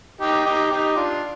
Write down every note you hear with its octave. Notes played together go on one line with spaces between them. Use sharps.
D#4 G4
D#4 G4
D#4 G4
D4 F4